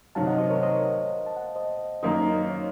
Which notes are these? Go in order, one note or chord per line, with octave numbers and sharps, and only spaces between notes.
C3 D#3 F#3 F5 A5
D#5 F#5
C5 D#5
A#4 C#5
C5 D#5
A5
F#5
F5
C5 D#5
F#2 D#3 A#3 D#4 A#4
C#5 F5